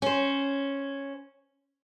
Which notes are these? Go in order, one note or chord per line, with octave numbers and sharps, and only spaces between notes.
C#4 C5